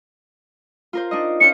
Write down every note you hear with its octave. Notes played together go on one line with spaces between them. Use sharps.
F4 A#4 C5
D4 D#4 D#5
C#4 F4 C5 C#7